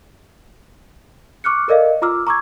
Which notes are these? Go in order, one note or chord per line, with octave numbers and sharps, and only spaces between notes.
C#6 D6 F6 F#6 C#7
A4 A#4 D5 D#5 F5
F4 A#5 D6 E6 F6
A#5 C#6 D6 E6 G#6